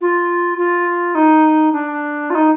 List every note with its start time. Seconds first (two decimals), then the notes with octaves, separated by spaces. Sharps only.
0.01 F4
0.58 F4
1.15 D#4
1.72 D4
2.30 F4
2.35 D#4